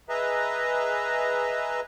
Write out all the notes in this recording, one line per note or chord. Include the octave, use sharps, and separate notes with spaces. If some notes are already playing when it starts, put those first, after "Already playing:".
G#4 B4 D#5 E5 A#5